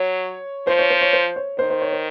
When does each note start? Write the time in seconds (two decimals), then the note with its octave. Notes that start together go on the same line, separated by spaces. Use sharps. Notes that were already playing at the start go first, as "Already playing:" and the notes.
Already playing: F#3 C#5
0.67 F3 C5
0.79 C#5
0.90 C5
1.01 C#5
1.13 C5
1.36 C#5
1.59 D#3 C5
1.70 C5
1.82 C#5
1.92 C5